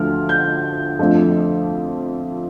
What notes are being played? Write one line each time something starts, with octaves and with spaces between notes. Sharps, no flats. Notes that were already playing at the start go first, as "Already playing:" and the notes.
Already playing: D2 D3 F3 A3 F6
G6
F2 D3 F3 A3